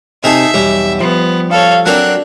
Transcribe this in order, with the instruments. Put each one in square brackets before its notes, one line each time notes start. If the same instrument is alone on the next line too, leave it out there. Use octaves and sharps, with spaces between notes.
[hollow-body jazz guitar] C3 [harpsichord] D#4 G#4 A4 [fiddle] E5
[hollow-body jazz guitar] B1 E2 [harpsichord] G3
[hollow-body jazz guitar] F3 [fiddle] B3
[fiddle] A4 C#5 [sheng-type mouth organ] F5
[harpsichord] F#3 C4 A#4 [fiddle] D4 [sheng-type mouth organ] F#6